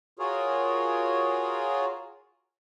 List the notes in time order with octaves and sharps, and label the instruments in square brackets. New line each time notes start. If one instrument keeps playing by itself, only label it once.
[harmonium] F4 F#4 G#4 A#4 C#5